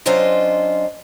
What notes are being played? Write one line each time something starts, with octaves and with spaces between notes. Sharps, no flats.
F#3 C#4 D4 F4 C5 D#5